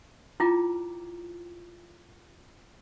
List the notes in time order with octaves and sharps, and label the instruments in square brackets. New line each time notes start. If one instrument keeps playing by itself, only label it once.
[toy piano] E4 F4 G5 A#5 D6